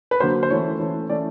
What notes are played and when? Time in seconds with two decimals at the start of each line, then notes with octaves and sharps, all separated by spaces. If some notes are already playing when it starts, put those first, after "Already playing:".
0.11 B4
0.20 D3 F#3 A#3 C5
0.43 C5
0.50 E3 A3 C#4 C#5
0.80 E3 A3 C#4
1.10 E3 A3 C#4 D5